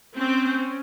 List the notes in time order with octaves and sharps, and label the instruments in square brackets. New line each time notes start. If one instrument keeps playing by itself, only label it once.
[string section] C4 [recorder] C#4